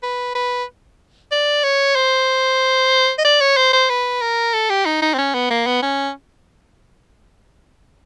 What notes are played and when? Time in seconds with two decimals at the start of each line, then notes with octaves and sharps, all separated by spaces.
0.03 B4
0.35 B4
1.32 D5
1.64 C#5
1.96 C5
3.18 D#5
3.25 D5
3.41 C#5
3.57 C5
3.73 C5
3.90 B4
4.22 A#4
4.54 A4
4.70 G4
4.86 D#4
5.02 D#4
5.14 C4
5.18 C#4
5.34 B3
5.50 A#3
5.66 B3
5.82 C#4